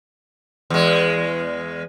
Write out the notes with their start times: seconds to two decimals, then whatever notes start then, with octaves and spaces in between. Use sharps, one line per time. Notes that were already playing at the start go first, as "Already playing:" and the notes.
0.70 E2 G#3